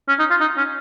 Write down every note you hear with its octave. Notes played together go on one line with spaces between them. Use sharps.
C#4
D#4
F4
D#4
C#4